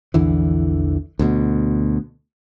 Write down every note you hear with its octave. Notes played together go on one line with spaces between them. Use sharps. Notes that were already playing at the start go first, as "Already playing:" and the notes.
A#1 E2 D3 E3
D2 B2